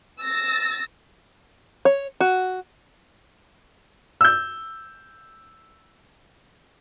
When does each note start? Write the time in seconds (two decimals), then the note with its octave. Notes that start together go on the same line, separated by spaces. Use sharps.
0.22 E6 A6 A#6
1.85 C#5
2.20 F#4
4.21 E6 G6